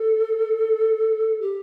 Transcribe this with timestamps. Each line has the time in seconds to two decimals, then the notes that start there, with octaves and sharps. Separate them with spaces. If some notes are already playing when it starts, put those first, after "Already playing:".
Already playing: A4
1.41 G4